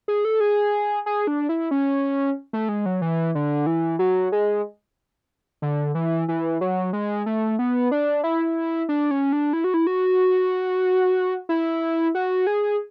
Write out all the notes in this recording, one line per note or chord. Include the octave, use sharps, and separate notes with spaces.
G#4
A4
G#4
G#4
D4
E4
C#4
A3
G#3
F#3
E3
D3
E3
F#3
G#3
D3
E3
E3
F#3
G#3
A3
B3
D4
E4
D4
C#4
D4
E4
F#4
E4
F#4
E4
F#4
G#4